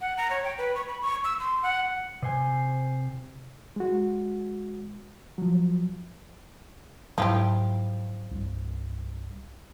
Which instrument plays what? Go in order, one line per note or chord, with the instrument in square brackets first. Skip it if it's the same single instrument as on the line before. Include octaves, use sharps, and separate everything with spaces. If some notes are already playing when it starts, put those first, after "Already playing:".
[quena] F#5
A#5
C#5
G5
B4
C#6
B5
C#6
E6
C6
F#5
[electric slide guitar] C3 C5 G#5
[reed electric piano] G#3 F#4
F3 F#3
[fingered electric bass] G#2 F#3 [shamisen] F3 E4 G4
[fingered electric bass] C2 G2